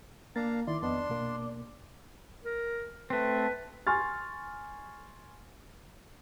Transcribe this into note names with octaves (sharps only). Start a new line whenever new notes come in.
A#3 D4 F5 A#5 A6
D#3 E4 D5 C6
F2 B3 D4 D#5 C6
B2 A#3
A#4
A3 C4 B4
G#5 C6 C#6 F6 A6